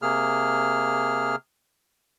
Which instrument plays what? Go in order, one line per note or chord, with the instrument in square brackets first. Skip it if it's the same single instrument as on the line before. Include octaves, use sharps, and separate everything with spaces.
[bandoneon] C3 A#3 G#4 F6